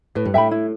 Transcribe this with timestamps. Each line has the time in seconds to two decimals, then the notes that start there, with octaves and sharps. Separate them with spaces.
0.15 A2 B4
0.26 G2
0.34 A2 E5 G5 B5
0.51 E4